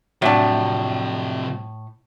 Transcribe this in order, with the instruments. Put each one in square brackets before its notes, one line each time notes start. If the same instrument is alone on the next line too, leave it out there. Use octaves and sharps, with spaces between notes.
[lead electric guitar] F2 C3 [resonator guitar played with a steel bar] A2 A5 [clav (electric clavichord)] F#3 D4